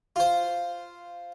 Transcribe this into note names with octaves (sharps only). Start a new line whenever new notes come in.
F4 C5